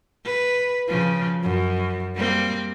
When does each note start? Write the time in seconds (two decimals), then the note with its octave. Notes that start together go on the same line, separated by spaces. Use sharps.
0.25 B4
0.88 C#3 F3
1.43 F#2
2.15 G3 A#3 C4